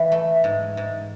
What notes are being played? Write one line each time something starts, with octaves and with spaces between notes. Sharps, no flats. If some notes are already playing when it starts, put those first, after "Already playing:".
Already playing: E3
A3
G#2
G#2